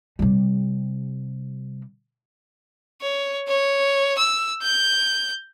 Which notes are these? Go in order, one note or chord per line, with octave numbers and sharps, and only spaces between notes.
C3 G3
C#5
C#5
E6
G6